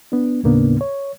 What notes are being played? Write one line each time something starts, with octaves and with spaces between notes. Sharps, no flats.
B3 D4
D#2 A2 C#3 A#3 B3 D4
C#5